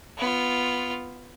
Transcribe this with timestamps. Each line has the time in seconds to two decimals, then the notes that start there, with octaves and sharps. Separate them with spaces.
0.18 B3 F4